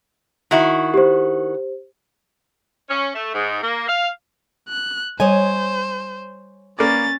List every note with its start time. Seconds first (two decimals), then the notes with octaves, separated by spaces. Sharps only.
0.51 D#3 E4 F#4
0.94 G4 C5
2.89 C#4
3.15 A3
3.34 G#2
3.62 A#3
3.88 F5
4.68 F#6
5.20 G3 C5 C#5 D#5 G#5
6.79 A#3 C#4 B4 D5 A6